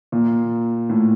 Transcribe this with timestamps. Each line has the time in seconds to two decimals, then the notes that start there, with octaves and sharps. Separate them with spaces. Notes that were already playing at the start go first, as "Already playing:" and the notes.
0.12 A#2
0.90 A2